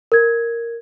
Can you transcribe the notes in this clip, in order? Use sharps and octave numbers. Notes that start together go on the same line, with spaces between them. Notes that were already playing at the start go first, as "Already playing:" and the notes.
A#4 G#6